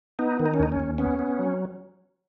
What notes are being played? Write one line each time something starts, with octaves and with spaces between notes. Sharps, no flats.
B3 D#4
D#3
D#4
C#4
D#2 D#4
C#4
D#2
B3 C#4
B3
F#3